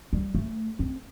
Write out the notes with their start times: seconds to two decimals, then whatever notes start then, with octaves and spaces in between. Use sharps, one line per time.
0.13 G3
0.35 A3
0.79 C4